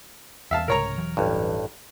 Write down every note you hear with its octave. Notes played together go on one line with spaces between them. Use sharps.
E2 E5 F5 A5
C2 G#2 C#3 A#4 C#5 A#5
E1 E3 F#3
A1 G2